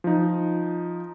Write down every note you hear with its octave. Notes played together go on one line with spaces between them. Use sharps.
F3 D#4